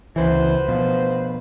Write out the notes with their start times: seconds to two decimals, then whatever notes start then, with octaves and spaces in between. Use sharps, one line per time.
0.16 C#2 E3 F#4 B4 C5
0.68 B2 F3